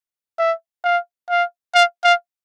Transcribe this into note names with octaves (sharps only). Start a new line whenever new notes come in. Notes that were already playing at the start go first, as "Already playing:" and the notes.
E5
F5
F5
F5
F5